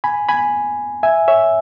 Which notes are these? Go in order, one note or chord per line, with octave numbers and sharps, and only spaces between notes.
G#5 B5
G#5 B5
E5 G#5
C#5 E5